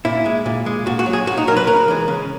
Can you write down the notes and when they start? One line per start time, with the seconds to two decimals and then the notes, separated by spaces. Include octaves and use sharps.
0.05 A#2 E4
0.26 G#3
0.46 A#2
0.66 G#3
0.86 A#2 F#4
0.99 F#4
1.06 F#3
1.13 G#4
1.26 A#2 F#4
1.37 D#4
1.47 F#3 A#4
1.57 B4
1.67 C#3 A#4
1.88 E3 G#3
2.08 C#3